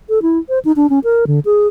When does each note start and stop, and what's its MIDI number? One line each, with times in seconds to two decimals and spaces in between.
0.09 0.22 69
0.22 0.39 64
0.49 0.59 72
0.65 0.72 63
0.76 0.89 62
0.90 0.99 61
1.04 1.25 70
1.27 1.40 50
1.45 1.67 68